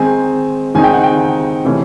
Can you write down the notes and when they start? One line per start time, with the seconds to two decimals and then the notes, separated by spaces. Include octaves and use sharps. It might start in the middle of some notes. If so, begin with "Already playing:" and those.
Already playing: D#3 G#3 C4 D#4 G#5
0.75 D#3 G#3 C4 D#4 G#5
0.84 G5
0.94 F#5
1.03 G5
1.65 C3 E3 A3 C#4